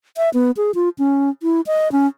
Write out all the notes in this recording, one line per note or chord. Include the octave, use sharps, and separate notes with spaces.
E5
B3
G#4
F4
C#4
E4
D#5
C#4